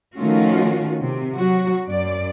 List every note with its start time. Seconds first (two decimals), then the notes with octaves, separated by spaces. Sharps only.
0.17 D#3 F3 A3 C#4 F4 F#4
1.01 C3
1.35 F#3 F#4
1.87 F#2 D5